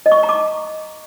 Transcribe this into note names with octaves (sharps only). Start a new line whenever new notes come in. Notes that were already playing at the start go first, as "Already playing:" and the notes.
D#5
C#6
D#5
A#5
D6